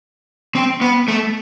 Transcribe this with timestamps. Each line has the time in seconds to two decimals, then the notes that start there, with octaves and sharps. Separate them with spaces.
0.55 C4
0.81 B3
1.08 A3